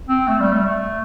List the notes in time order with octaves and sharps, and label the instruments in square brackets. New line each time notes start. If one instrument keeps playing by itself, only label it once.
[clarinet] C4
A3
G3
A3
A3